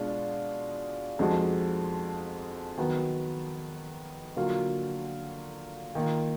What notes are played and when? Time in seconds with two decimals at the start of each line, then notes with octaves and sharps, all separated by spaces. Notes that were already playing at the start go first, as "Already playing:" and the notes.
Already playing: B2 G#3 D4 F4
1.19 F2 F3 G#3 D#4 F#4
2.78 D#3 F#3 B3
4.36 D3 F#3 A#3 F4
5.95 D#3 A#3 F4